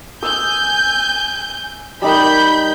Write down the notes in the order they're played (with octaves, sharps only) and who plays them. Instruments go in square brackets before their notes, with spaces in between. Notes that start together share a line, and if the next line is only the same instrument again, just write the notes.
[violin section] G#5 G6 [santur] D#6 E6
[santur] G3 D#4 A#4 [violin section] B5 G6